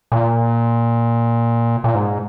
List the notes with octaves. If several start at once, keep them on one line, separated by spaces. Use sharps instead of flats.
A#2
A#2
G#2